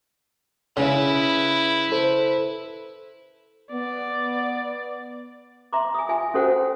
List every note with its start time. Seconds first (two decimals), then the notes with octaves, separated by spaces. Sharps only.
0.77 C#3 E4 B4
1.92 A4 C5
3.72 B3 D5
5.73 E5 A#5 C6 D6
5.94 G#5 D#6
6.09 F4 E5 G#5
6.34 C#4 F#4 A4 C5 F#5 G5